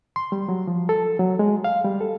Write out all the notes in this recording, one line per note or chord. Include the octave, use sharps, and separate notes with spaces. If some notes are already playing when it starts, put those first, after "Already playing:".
C6
G3
F#3
F3
A4
F#3
G#3
F5
G3
A4